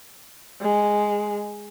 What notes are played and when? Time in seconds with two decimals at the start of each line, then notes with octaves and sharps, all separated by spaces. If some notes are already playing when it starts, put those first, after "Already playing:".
0.62 G#3